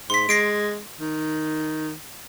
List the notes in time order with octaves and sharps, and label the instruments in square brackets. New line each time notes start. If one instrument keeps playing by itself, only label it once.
[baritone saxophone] G#2 [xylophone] C6 B6
[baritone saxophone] G#3 [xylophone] A#6 C7 D7
[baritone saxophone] D#3